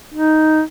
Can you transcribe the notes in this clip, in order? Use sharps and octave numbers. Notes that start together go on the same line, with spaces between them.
D#4